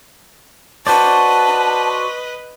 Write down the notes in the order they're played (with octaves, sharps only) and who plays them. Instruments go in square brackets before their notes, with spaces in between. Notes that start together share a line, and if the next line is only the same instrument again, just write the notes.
[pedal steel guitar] F#4 C5 D5 [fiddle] B4 D#5 [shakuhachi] A5